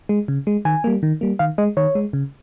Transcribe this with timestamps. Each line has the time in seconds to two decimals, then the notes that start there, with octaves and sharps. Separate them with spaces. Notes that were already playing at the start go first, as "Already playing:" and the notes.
0.09 G#3
0.28 C#3
0.47 G#3
0.65 D#3 G#5
0.84 G3 A#3
1.03 D#3
1.21 G3 A#3
1.39 D#3 F5
1.58 G#3 D#5
1.77 D#3 C#5
1.95 G#3
2.13 C#3